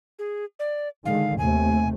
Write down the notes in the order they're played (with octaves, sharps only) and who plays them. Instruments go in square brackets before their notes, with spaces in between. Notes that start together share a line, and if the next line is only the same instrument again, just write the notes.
[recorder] G#4
D5
[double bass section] D3 D#3 G#3 [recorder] F5
[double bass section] D#2 C3 A3 [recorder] G#5